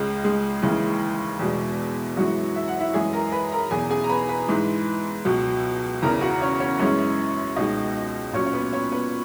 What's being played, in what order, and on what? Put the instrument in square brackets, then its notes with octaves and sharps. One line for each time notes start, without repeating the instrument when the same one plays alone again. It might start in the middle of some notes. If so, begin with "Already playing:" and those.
Already playing: [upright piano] C#2 C#3 G#3
G#3 G#4
D#2 C#3 E3 G#3
E2 B2 G#3
F#2 E3 F#3 G#3 F#4
E5
F#5
E4 E5
F#2 E3 G#3 G#4 G#5
A#4 A#5
B4 B5
A#4 A#5
E2 B2 F#3 G#4 G#5
G#4 G#5
A#5
B4 B5
B4 B5
G#2 E3 G#3
C#2 B2 F#3
E2 C#3 E3 A#4 A#5
F#4 F#5
C#4 C#5
C#4 C#5
F#2 E3 G#3 C#4 C#5
C#2 B2 G#3 D#4 D#5
A#2 F#3 C#4 C#5
C#5
B3 B4
C#4 C#5
B3 B4